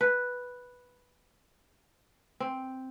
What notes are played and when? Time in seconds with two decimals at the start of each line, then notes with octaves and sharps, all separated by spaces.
0.01 B4
2.40 C4